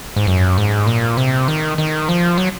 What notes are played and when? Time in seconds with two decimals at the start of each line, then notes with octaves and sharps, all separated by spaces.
0.16 G#2
0.27 F#2
0.58 G#2
0.87 A#2
1.17 C3
1.48 D#3
1.78 D#3
2.09 F3
2.38 F#3